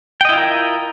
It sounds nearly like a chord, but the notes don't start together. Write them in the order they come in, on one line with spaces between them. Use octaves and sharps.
G5 D#5 E4 F4 A#4